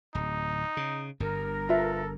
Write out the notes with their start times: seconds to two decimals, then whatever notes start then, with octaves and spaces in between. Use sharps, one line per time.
0.15 D1 D#4
0.77 C#3
1.20 G1 G2 A#4
1.69 F4 A4 B4 E5